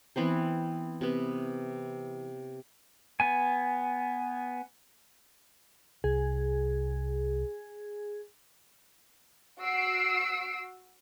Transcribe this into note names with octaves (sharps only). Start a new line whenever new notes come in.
E3 B3 C4 C5
C3 B3
B3 G#5
C2 G#4
F#4 E6 C7 D7